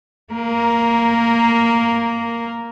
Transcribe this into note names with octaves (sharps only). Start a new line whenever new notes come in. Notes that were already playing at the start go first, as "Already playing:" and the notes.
A#3 A#4